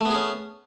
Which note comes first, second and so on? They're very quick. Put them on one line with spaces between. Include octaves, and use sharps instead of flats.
A3 B3 G#4 C#4